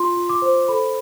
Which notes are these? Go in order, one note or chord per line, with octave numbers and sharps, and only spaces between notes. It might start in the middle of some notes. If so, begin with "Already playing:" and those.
Already playing: F4 C6
F4
D6
C5
A4 B5